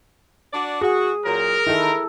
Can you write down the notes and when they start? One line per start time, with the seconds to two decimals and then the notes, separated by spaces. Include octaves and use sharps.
0.53 D4 F#4 D5
0.82 F#4 G#4
1.25 A#2 F#3 A#4
1.67 D#3 E4 A4